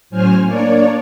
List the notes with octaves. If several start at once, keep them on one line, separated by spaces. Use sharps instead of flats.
A2 F#3 C#4 C5 G#5 F6
A#3 D4 C#5 D5